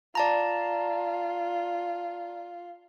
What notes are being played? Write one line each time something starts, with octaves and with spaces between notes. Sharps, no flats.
F4 D5 A5 A#5